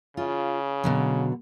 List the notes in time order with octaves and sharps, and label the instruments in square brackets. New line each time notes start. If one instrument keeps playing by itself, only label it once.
[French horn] C#3 [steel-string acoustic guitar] F4
[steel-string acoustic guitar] B2 D3 F#3